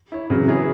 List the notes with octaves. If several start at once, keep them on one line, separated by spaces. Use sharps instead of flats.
E4 C#5
C#3 E3 F#3
B3 E4 G#4 C#5